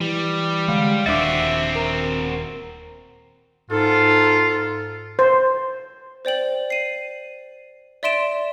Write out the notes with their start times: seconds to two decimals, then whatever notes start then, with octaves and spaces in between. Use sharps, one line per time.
0.01 E3 G3
0.68 D3 G#3 F5
1.06 D#1 D#2 C4 D4 F#4 E5 D6 A6
1.76 A#4 A#5
3.70 G#2 F4 A4
5.19 C5
6.25 C5 D5 G5 F#7
6.70 C7 D#7
8.03 D5 E5 C6 D7 E7